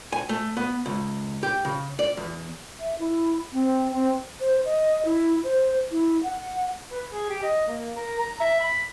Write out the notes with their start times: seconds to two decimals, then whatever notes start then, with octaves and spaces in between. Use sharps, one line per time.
0.12 G#5
0.29 A3
0.57 B3
0.86 C#2
1.43 G4
1.65 C#3
1.99 D5
2.17 E2
2.80 E5
2.99 E4
3.53 C4
3.92 C4
4.40 C5
4.65 D#5
5.05 E4
5.44 C5
5.91 E4
6.23 F#5
6.91 B4
7.10 G#4
7.30 G4
7.43 D#5
7.68 A#3
7.96 A#4
8.19 A#5
8.41 E5
8.60 B5